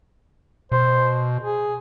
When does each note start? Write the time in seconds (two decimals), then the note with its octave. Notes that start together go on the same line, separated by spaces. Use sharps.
0.72 B2 C5
1.41 G#4